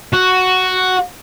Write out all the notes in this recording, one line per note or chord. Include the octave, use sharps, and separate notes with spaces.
F#4